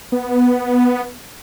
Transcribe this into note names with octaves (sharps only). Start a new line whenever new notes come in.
B3